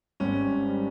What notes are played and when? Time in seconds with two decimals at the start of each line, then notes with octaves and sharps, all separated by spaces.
0.20 G#1 G#2 G3 C#4
0.69 G3